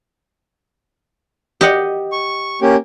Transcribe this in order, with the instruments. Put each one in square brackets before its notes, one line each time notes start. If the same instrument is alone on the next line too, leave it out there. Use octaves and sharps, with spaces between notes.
[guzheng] G4 D#5 F#5
[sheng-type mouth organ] C#6
A#3 C#4 G4